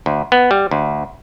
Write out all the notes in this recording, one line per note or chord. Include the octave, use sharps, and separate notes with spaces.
D2
B3
G3
D2